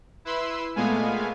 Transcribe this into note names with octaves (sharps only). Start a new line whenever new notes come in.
E4 B4 B5 C6 E6
A#2 G#3 A3 B3 F5 G#5